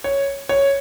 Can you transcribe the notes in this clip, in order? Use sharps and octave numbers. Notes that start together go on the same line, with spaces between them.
C#5
C#5